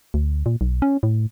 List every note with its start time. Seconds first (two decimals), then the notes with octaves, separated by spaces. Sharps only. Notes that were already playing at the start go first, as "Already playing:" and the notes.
0.14 D2
0.46 A#2
0.61 B1
0.82 C#4
1.03 A2